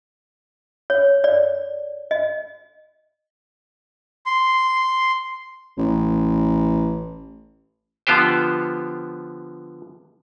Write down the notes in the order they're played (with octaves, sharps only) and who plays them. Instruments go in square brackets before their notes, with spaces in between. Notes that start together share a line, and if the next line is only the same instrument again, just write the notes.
[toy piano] C#5
D5
D#5
[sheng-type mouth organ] C6
[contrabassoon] A1
[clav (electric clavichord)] D3 F3 B3 F4 G4 C5